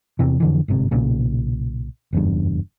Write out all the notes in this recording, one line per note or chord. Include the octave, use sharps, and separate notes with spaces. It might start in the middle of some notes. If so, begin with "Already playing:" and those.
E2 C3 E3
F2 D3 E3
G1 G#2 C3
B1 A#2 C#3
F#1 E2 G2